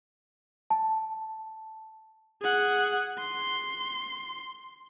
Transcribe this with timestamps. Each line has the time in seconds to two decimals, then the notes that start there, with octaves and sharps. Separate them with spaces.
0.70 A5
2.42 G#4 F#5
3.20 C6